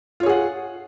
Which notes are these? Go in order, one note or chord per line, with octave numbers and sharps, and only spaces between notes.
F4 G#4 C#5 F#5